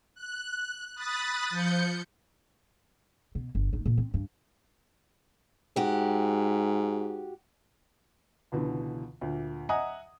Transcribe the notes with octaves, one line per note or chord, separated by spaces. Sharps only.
F#6
B5 D#6 F#6 A6
F3 G6 C#7
B2
G1
G1 D#4
A#2
C4
G2
G#2 F#4 G4
C#2 B2 D3 E3
D2 A#2
D#5 E5 F#5 G#5 A#5 D#6